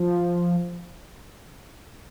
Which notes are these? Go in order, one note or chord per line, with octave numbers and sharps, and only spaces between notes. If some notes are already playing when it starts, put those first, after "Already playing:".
Already playing: F3